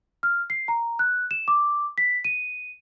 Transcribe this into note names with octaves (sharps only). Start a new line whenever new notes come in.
F6
C7
A#5
F#6
E7
D6
B6
D#7